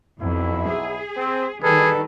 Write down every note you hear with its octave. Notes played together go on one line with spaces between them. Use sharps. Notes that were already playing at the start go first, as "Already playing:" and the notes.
B1 F2 E4
G#4
C4
D#3 G3 G#4 A4 B4